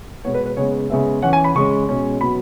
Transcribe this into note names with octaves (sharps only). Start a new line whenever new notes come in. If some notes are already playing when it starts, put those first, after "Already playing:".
B2 G#3 B3 C#5
B4
B4
C#3 G#3 B3 C#5
C#3 G#3 B3 E5
E3 C#4 F#5
G#5
B5
C#3 G#3 C#4 C#6
B2 G#3 C#4
B2 F#3 B3 B5